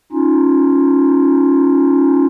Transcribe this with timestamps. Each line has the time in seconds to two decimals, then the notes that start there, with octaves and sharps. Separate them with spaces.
0.12 C#4 D#4 F4